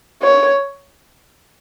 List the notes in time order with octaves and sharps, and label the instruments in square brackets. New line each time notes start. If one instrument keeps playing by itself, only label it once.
[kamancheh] C#5